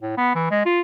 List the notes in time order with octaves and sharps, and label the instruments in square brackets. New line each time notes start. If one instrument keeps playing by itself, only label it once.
[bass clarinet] A2
B3
E3
G#3
F4